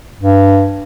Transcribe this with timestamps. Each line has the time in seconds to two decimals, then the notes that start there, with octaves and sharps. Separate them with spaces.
0.19 G2